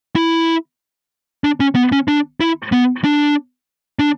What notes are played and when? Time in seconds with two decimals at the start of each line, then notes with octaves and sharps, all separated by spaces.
0.16 E4
1.44 D4
1.60 C#4
1.75 B3
1.92 C#4
2.08 D4
2.40 E4
2.72 B3
3.04 D4
3.99 D4